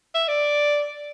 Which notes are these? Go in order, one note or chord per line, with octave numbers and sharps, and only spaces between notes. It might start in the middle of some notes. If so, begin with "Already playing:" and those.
E5
D5